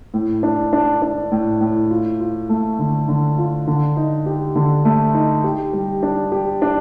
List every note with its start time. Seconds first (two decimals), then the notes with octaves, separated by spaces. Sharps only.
0.14 A2
0.43 D4
0.73 D4
1.02 D4
1.32 A2
1.61 A2
1.90 F4
2.20 F4
2.49 A3
2.79 D3
3.08 D3
3.38 F4
3.67 D3
3.97 D#4
4.26 G4
4.56 D3
4.85 A3
5.14 D#4
5.44 G4
5.73 G3
6.03 D4
6.32 G4
6.62 D4